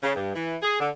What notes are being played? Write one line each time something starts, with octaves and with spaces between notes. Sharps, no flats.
C#3
G2
E3
G#4
D3